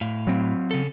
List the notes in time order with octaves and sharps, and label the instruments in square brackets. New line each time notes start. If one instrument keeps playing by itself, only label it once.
[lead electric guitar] A2 F5
[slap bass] F#3 C4
[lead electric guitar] C#3 A4